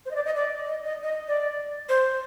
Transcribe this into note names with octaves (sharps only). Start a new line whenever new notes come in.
C5
D#5
D5
D#5
D5
D#5
D#5
D#5
D5
C5